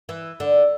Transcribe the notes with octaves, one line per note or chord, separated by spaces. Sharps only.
E3
D3